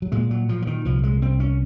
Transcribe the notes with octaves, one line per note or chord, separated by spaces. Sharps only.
F#3
A#2 G#3
F#3
A#2 F3
F3
D#3
C2 F3
G#3
C2 C4
C#4